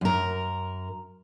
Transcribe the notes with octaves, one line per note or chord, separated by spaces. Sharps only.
F#2 A#4